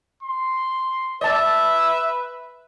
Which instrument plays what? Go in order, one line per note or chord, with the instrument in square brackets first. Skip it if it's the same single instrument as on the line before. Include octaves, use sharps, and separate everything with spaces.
[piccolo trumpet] C6
[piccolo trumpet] B4 [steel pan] D5 A5 [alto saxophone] E5